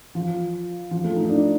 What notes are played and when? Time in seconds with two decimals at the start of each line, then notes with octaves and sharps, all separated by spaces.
0.15 F3
0.91 F3
1.04 A3
1.16 D#4
1.30 D4